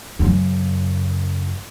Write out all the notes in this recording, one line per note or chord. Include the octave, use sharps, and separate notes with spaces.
F#2 C#3